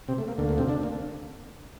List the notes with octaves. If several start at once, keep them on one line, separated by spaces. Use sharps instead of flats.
C3 C4
A3
A#3
D2 D3 A#3
A#3
C3 C4
D3 D4
A#3